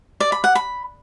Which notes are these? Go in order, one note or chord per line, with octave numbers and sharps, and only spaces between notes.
D5
B5
F#5
B5